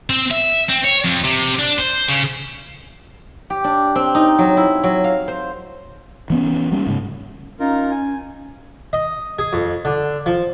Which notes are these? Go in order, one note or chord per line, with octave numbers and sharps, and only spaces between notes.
C4
E5
C4
C#5
F2
C3
D4
C5
C#3
G4
D4
C4
D#4
F#3
E4
F#3
F5
C5
E3 B3 C#4
G3 A#3 C#4
G#2 C#3
C#4 D#4 F4 A#4
G#5
D#5
G#4
F2
D3
F3